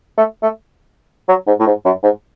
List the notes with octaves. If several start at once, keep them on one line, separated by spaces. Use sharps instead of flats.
A3
A3
F#3
G#2
A2
G#2
F#2
G#2